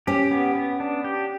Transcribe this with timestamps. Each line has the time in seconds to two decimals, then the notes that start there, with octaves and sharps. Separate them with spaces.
0.07 C#4 G4
0.31 B3
0.55 B3
0.80 D4
1.04 G4